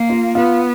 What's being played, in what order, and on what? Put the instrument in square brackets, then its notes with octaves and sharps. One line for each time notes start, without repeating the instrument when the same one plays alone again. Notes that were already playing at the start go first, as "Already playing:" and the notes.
Already playing: [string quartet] A#3
[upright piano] F4
[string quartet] B3 [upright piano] F4